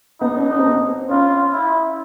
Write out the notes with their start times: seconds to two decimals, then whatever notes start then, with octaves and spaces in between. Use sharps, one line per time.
0.21 B3 D#4
0.37 C#4
0.51 C#4
0.59 C4
0.67 B3
0.75 C4
1.09 C#4 F4
1.54 E4